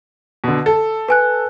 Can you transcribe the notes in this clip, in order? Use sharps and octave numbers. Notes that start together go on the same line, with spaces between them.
B2 D3
A4
B4 G#5 F#6